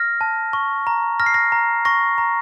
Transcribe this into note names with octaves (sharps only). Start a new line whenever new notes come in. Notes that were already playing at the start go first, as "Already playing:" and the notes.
Already playing: F6 A#6
A5
C#6
A#5
F6 A#6
C7
A#6
A#5
C#6 A#6
A#5